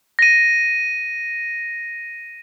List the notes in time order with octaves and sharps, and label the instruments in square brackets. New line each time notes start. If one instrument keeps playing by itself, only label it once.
[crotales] A#6 D#7